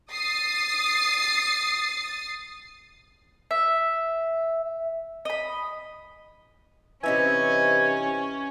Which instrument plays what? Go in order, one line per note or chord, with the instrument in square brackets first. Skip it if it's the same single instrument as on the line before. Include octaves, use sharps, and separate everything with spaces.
[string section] D#6 A6 C7
[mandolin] E5
D#5 B5
[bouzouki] C3 D#4 E5 [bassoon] E3 [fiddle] C#4 [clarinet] G#5